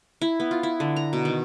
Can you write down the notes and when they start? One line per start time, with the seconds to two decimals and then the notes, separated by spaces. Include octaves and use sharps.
0.22 E4
0.40 B3
0.51 F4
0.63 E4
0.80 D3
0.96 A#5
1.13 B2
1.25 D#3